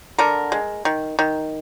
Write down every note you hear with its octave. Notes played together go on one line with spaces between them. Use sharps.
D3 A#4
G#3
D#3
D#3